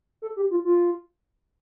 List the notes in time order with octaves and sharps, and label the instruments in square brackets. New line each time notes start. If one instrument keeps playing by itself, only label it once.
[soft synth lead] A4
G4
F4
F4